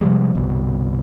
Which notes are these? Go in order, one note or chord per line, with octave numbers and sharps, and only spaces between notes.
C3 F3 G3 G#3
G1 C2 B2